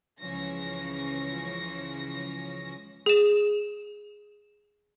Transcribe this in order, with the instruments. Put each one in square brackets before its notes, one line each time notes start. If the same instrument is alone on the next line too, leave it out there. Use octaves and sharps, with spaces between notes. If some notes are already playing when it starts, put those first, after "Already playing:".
[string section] C#2 C#3 E3 F3 C#4 A#6
[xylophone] G#4 E7